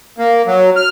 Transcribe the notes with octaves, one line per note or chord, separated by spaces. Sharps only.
A#3
F#3
F6